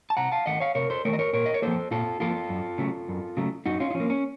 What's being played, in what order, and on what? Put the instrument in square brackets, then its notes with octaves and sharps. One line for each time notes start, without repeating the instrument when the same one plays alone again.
[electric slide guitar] A5
C3 F#5 A#5
F5 A5
D#3 A3 D#5 F#5
C#5 F5
C3 A#4 C#5
A4 C5
A3 A#4 C#5
D#3
D#5
A#4 C#5
A#2 A#4 C#5
D#5
C#5
F3 A#3 A4 C5
A#2 F4 A4
F3 A#3 F4 A4
F#2
C#3 F#3 A3
F#2
C#3 F#3 A3
F#2 D#4 F#4
C#4 F4
D#4
F3 C#4
A#3
C#4